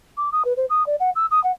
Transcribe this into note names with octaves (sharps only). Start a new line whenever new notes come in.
D6
D#6
B4
C5
D#6
D5
F#5
E6
D#6
F#5